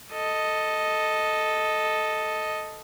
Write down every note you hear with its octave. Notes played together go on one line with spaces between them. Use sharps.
A4 D#5